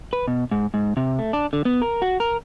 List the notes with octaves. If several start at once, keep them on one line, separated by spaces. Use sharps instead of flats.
B4
B2
G#2
G#2
C3
A3
D4
D3
B3
A#4
F#4
A#4